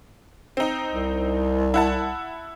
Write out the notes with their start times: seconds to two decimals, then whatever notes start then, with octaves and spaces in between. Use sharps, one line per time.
0.57 C4 D#4
0.92 C2
1.74 E4 F#5 A5